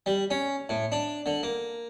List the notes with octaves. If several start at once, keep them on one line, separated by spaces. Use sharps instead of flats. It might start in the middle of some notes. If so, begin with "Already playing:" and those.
G3
C#4
A2
D4
D3
A#3